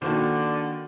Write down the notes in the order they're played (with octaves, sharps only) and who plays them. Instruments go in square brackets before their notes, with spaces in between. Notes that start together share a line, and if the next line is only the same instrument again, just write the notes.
[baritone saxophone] D3 [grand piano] D#3 A#3 D4 [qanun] F#4 A4 C5